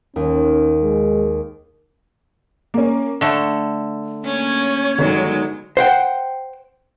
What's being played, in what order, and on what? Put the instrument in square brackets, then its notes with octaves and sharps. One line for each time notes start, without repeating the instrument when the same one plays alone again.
[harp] D#2 [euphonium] C#4
[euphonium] G#3
[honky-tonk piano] A#3 C#4
[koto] D3 A3 [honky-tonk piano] E7
[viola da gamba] A#3 C#4 [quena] C#5
[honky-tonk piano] G1 D#3 [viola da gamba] F#3 G#3
[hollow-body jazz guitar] C5 F#5 G5